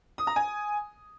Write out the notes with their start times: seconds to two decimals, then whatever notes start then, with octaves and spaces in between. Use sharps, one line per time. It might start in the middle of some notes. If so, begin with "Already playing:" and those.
0.18 D#6
0.27 A#5
0.36 G#5